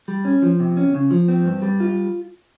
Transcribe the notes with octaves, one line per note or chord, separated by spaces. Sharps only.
G3
C#4
F3
C3
C#4
C#3
F3
C4
G2
G3
F4